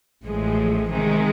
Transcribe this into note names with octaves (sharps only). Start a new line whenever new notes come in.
A1 A2 F3 G#3
C3 D#3 G#3